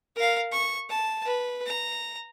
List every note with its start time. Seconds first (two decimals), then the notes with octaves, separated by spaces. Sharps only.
0.16 A#4 F5
0.52 C#6
0.90 A5
1.25 B4
1.66 A#5